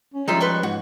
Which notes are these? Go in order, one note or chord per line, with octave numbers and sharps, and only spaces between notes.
C#4
F3 G3 G#3 D#4 E5 C6
B4 C6 C#6
G#2 F#4